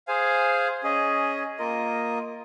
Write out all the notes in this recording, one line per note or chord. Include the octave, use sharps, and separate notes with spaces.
G#4 C5 F5 G#5
C#4 G#4 D#5
A#3 F4 A#4 D#5